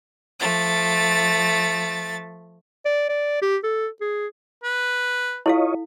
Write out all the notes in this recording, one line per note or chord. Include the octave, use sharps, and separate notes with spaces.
F3 A3 A6
D5
D5
G4
A4
G#4
B4
E4 F4 A4 C#5 D#5 F5